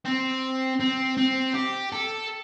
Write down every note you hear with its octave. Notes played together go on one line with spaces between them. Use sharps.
C4
C4
C4
G4
A4